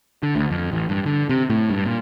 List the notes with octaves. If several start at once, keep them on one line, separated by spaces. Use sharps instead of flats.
D3
D2
F2
A1
G2
D3
C3
A2
G2
A#2